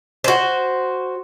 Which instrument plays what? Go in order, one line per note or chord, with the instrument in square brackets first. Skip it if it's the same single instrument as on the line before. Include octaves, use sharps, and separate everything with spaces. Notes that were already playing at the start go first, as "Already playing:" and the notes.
[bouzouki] F#4 C5